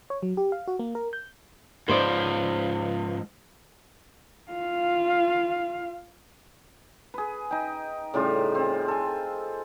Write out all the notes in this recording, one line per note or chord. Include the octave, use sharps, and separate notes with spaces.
C#5
F#3
G4
F5
F#4
A#3
A#4
G6
G#2 F3 B4 C5 D5
F4 F5
G#4 B4
D#4 G5
A2 C#3 G3 F4
C4
A4 G#5